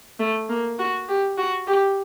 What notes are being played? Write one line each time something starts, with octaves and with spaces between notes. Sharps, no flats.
A3
A#3
F#4
G4
F#4
G4